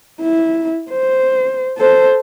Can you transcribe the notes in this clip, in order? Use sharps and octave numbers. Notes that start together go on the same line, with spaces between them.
E4
C5
A4 C5